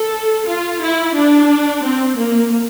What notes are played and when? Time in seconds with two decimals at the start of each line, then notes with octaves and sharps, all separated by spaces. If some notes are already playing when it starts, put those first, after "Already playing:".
Already playing: A4
0.46 F4
0.81 E4
1.14 D4
1.82 C4
2.16 A#3